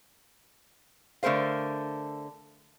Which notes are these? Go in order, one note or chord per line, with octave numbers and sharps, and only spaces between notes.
D3 A3 A#4 C5 F5